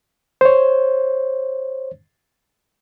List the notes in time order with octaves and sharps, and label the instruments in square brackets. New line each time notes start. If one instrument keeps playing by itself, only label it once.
[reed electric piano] C5 C#5